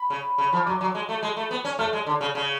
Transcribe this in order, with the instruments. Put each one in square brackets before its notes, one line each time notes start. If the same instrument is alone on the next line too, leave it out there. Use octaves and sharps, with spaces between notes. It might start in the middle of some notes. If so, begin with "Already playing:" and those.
Already playing: [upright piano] B5
[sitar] C#3
C#3
F3
[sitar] F#3 [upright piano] D6
[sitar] F#3
G#3
A3
G#3
A3
B3
C#4
[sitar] A3 [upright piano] F6
[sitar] G#3
D3
C#3
C#3